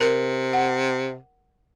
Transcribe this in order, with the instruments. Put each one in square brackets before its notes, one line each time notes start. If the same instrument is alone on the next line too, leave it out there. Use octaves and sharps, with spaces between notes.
[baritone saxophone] C3 [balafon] A#4
[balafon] F#5